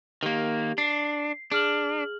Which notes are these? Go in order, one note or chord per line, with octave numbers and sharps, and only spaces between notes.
D#3 A#3 G4
D4 C7
D4 G#4 F6 F#7